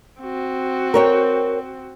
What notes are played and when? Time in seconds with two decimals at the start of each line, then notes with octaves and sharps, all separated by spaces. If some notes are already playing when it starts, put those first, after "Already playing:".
0.21 C4 F#4
0.94 A#4 C#5 G5